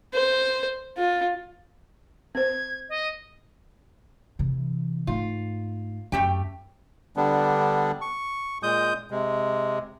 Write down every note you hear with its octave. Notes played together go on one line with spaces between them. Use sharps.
C5
F4
C4 C5 G#6
D#5
C3 E3
G#2 A3 F4
F#2 A3 G4 G5
D3 G3 B3 D4
C#6
A#2 G#3 D#6 G6
C3 G#3